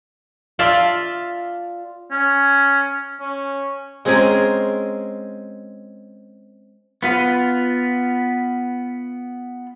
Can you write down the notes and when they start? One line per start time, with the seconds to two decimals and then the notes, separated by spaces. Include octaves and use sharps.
0.59 F4 D5 E5 F5 A5
2.11 C#4
3.21 C#4
4.05 G#3 C4 C#4 G#4 A#4
7.03 B3 F4 B4